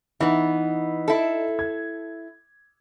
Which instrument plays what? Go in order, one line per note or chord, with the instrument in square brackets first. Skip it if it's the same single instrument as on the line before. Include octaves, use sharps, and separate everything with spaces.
[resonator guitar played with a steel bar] E3 B3 [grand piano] D#4
[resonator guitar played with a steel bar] E4 A4
[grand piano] G#6